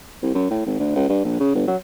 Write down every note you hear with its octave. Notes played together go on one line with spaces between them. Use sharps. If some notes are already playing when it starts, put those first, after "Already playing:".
C2
F#2
A2
G#1
D2
C#2
G2
A#1
C#3
G1
F#3